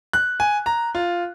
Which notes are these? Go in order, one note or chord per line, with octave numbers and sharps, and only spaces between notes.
F#6
G#5
A#5
F4